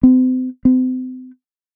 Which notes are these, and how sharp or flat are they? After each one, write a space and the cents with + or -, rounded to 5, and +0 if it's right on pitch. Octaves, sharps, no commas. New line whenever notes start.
C4 -40
C4 -40